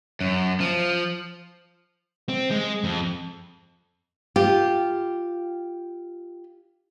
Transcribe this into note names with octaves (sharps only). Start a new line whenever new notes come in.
F#2
F3
C4
G#3
F2
F4 G4